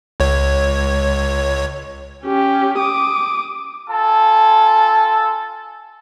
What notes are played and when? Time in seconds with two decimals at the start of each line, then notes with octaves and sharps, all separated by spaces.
0.20 C#2 C#5
2.24 C#4 G4
2.79 D6 D#6
3.89 F4 A4 G#5 A5